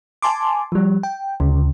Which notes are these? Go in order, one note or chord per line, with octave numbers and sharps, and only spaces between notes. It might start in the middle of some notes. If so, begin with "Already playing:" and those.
G#5 A5 C6 D6
F3 G3
G5
D2 C#3